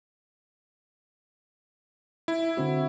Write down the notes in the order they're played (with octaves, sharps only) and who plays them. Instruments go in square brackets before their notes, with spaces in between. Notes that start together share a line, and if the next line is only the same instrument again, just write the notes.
[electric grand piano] E4
[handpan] D3 C4 F#4